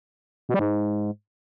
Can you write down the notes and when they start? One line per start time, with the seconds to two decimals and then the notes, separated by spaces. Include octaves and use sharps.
0.49 B2
0.54 G3
0.59 G#2